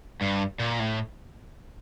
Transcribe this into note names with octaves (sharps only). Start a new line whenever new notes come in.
G2
A#2
A2